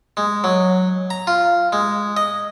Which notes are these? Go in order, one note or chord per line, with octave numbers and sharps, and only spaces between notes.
G#3
F#3
A#5
F4
G#3
D#5